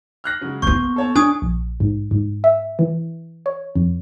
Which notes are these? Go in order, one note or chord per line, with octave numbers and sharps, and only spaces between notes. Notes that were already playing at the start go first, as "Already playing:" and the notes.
F6 F#6 A#6
C#3 F#3 G#3
A#3 B3 C6 C#6 G6
A4 C#5 A5
D4 G#5 C#6 D#6 G#6
A#1
G#2
G#2
E5
E3
C#5
F2